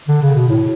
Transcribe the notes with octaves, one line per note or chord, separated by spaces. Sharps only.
D3
C#3
B2
A2